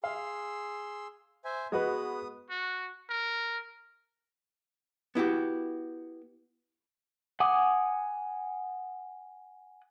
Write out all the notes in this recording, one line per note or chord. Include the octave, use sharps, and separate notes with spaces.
G#4 F5 C6 E6
C5 E5 G#5
G#3 B3 F#4 B4 D#6
F#4
A#4
B3 E4 F#4 G4
F#5 G#5 D6 D#6